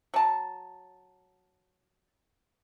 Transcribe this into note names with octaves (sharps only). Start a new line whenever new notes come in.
F#3 A5